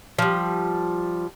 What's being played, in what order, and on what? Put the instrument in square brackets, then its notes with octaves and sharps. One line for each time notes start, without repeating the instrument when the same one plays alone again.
[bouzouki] F3 G3